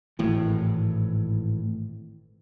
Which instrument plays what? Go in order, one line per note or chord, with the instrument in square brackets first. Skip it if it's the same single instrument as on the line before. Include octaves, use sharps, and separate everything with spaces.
[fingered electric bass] G#1 A2 E3